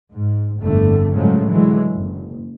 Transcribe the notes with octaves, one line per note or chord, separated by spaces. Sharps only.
G#2
G1 F2 A2 D3 A3
A2 C#3 F3 F#3 G#3 A3
D3 E3 F#3 G#3
F#1